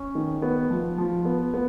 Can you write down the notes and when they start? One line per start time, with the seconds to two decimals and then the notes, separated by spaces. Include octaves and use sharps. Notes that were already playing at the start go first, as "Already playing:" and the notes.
Already playing: C#4
0.15 D#3
0.42 B3
0.70 F3
0.98 F3
1.25 B3
1.54 B3